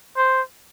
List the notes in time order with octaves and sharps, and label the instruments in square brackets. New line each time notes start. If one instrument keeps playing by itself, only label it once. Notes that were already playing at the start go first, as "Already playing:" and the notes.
[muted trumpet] C5